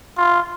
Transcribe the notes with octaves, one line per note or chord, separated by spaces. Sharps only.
F4